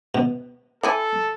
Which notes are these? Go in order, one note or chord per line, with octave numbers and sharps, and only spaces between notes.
B2
E3 E4 A4 G#5